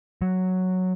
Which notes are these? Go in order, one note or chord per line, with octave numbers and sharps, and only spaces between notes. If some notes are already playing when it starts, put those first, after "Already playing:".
F#3